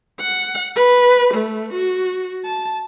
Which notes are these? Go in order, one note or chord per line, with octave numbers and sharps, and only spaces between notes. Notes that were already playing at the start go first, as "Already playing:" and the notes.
F#5
B4
A3
F#4
A5